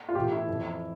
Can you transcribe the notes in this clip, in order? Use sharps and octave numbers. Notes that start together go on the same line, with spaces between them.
F4
A2 E3 G4
E4
F2 E3